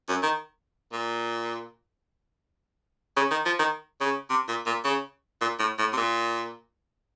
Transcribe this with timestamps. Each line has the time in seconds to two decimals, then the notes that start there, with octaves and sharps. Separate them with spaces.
0.09 F#2
0.23 D#3
0.93 A#2
3.16 C#3
3.31 D#3
3.46 F3
3.59 D#3
4.01 C#3
4.30 C3
4.48 A#2
4.66 A#2
4.85 C#3
5.41 A#2
5.59 A2
5.79 A2
5.93 C3
5.97 A#2